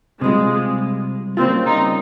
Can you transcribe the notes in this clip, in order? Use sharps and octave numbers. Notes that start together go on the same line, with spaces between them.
C3 G3 G#3 C4 F4
C#3 G3 A#3 C4 F4
D#4